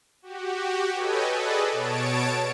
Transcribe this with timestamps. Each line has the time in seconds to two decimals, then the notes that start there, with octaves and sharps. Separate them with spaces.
0.22 F#4 G4
0.94 A4 B4 C#5 D#5 G5 G#5
1.31 G#4 A4 B4 D5 D#5
1.71 B2 C#5 A5 D7